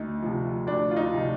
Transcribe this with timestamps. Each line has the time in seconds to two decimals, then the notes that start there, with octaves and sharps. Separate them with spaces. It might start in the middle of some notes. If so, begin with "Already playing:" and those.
Already playing: D2 D#4
0.22 C3 F3
0.66 D2 D4
0.91 F4
0.96 D#4
1.11 C3 F3